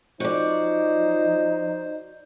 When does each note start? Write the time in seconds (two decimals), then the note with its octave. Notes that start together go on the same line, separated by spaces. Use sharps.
0.20 F3 D#4 F#4 C5 D5